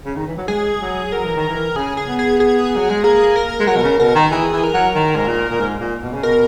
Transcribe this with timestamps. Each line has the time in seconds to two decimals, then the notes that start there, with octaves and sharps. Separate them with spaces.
0.05 C#3
0.16 D#3
0.27 E3
0.38 F#3
0.48 G#3 G#4
0.80 F#3
1.12 F#3 A#4
1.24 E3
1.37 D#3
1.49 E3
1.76 C#3 G#4
1.97 G#4
2.07 B3
2.19 G#4
2.40 G#4
2.77 F#3
2.90 G#3
3.04 A#3 G#4
3.36 A#4
3.60 G#3
3.67 F#3 A#4
3.77 B2
3.84 C#3
3.99 B2 A#4
4.15 D#3
4.32 E3 G#4
4.53 E3
4.64 A#4
4.74 F#3
4.96 D#3
5.16 G#2
5.28 A#2
5.50 A#2
5.60 G#2
5.81 A#2
6.03 B2
6.14 C#3
6.23 B2 A#4